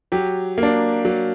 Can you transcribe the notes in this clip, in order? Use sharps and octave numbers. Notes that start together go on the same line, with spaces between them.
F#3 G4
A#3
D4
F#3